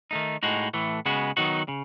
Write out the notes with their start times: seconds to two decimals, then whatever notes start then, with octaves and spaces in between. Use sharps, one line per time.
0.11 D#3 A3 D#4
0.43 A2 G#3 D#4 F#4
0.74 A2 E3 A3
1.06 C#3 G#3 B3 F#4
1.37 D#3 F#3 B3 D#4 F#4
1.68 C#3